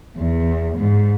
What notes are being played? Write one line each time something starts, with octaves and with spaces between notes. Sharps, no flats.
E2
G#2